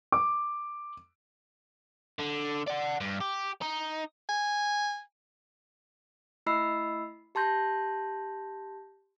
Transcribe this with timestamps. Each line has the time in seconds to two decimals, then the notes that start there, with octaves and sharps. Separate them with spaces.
0.12 D6
2.19 D3
2.68 D5 F#5
3.01 G2
3.21 G4
3.62 D#4
4.29 G#5
6.46 A3 E4 D#5 B5 E6 C7
7.35 G4 A5 C6 G6 A#6